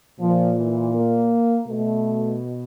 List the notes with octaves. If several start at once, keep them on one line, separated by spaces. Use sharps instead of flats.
A#2 F3
E3
A#3
B2 A3